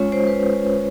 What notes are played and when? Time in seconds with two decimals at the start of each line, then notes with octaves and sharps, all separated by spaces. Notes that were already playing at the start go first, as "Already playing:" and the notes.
Already playing: G#3 C#4 F4 C#5
0.12 C5
0.27 B4